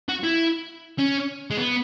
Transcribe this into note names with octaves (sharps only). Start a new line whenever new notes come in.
F#4
E4
C#4
G#3
B3